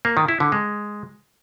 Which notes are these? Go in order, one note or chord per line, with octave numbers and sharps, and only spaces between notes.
A#3
D#3
E4
D3
G#3